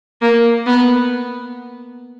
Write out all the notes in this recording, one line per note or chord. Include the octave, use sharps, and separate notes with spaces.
A#3
B3